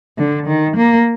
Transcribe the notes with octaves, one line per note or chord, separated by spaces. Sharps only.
D3
D#3
A#3